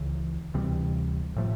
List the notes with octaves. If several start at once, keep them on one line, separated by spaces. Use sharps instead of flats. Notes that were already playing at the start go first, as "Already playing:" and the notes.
Already playing: C#2 C#3 E3
D2 C3 E3 G3
A2 F3 A3